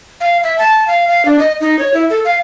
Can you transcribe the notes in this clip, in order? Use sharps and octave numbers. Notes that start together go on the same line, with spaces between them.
F5
E5
A5
F5
F5
D4
D#5
D#4
C#5
E4
A4
F5